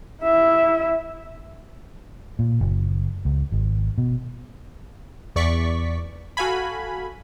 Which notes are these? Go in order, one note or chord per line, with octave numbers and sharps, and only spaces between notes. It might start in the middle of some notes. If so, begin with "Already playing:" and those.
E4 E5
A#2
F#1
C#2
G#1
B2
E2 D5 C#6 B6
F#4 A4 F5 G#5 B5